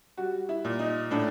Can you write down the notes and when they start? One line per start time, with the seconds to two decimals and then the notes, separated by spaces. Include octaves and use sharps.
0.17 G3 F#4
0.49 E4
0.65 A#2
0.79 D#4
1.11 A2 D4